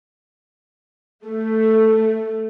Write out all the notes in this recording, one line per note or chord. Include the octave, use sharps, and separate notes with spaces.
A3